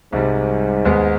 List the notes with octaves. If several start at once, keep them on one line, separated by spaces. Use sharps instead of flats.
C2 G#2 C3 G3
D#2 D#3 G#3 B3